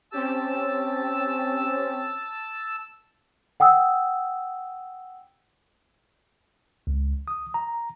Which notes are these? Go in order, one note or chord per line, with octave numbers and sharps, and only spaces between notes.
C4 C#4 G4 A5 E6
F#5 G5 D#6 E6
C#2
D#6
A#5